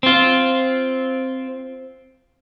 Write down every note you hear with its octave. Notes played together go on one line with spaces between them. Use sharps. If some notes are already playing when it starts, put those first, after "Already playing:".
C4 F4